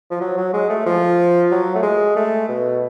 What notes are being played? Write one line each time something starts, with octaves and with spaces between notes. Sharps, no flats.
F3
F#3
F#3
G#3
A3
F3
F#3
A3
G#3
A3
B2